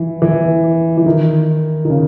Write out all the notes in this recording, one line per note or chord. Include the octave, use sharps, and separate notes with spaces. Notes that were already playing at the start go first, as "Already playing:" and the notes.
Already playing: E3
E3
E3
D#3
D#3
C#3